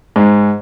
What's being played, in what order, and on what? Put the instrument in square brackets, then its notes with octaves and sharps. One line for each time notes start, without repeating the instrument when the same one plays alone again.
[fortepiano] G#2